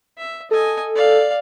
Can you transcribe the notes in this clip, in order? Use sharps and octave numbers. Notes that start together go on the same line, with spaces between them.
E5
A4 D#5 G#5
D5 F5